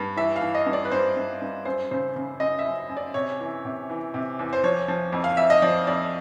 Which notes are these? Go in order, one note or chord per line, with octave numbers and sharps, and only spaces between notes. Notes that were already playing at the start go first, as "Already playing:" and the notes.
Already playing: G2
E3 E5
F5
E3
D#5
G2
D5
B4
G2 C5
G2
G2
F#2 C5
C#3 C5
C#3
F#2 D#5
E5
F#2
F#2
D5
C3 C#5
E3
C3
E3
C3
E2
C5
F3 C#5
F3
F2
F5
F2 E5
D#5
F3 D5
F2 D5